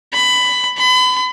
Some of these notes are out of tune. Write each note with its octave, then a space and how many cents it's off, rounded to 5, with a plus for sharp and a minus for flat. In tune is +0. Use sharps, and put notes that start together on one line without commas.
B5 +15
B5 +35